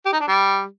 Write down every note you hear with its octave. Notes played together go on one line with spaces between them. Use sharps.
G4
D#4
D4
G3